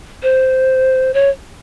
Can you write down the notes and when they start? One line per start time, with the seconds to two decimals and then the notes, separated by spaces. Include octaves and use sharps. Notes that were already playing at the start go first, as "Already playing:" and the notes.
0.23 C5
1.14 C#5